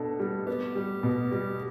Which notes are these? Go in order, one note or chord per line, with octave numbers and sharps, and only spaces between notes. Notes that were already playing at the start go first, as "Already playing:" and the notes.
Already playing: B2 D4 A4
G3
B3 G4
G3
B2
G3